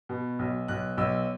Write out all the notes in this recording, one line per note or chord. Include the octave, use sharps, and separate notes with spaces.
B2
B1
B1 F#6
B1 E6